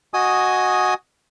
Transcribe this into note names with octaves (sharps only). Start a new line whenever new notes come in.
F#4 D#5 G#5 D#6